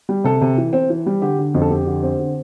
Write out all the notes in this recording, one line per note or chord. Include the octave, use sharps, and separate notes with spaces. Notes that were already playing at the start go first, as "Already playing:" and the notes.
G3
C3 A4
C3
E3
C4
E3
G3
D3 G4
D3
F2
A4
F2 G4
D3
C4
D3